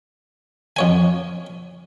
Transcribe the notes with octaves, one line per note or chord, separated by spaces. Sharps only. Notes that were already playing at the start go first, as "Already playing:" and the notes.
F2 C#5 G#5